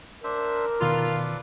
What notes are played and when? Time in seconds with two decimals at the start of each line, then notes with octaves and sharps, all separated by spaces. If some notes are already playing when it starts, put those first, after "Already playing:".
0.24 D4 A#4 C5 E5
0.81 E2 B2 D#3 F4 A4 B4 D5